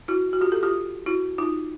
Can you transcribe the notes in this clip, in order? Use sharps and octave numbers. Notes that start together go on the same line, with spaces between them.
E4 F#4
F#4
F4 G4
G4 A4
F4 G4
E4 F#4
D#4 F4